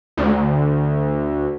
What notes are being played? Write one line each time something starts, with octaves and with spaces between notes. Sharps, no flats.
D2